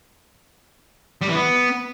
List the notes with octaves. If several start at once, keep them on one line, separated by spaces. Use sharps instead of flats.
G3
E3
B3